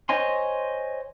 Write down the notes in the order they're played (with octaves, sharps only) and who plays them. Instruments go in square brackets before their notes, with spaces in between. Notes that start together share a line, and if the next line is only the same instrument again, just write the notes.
[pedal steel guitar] C5 C#5 D#5 G#5 C6